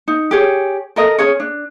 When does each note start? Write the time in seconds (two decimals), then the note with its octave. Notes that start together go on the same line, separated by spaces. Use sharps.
0.08 D#4
0.31 G4 G#4 C#5
0.96 A4 A#4 D#5
1.18 C#4 G#4 C#5
1.40 D4